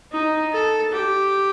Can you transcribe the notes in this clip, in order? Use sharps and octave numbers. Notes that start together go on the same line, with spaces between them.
D#4
A4
G4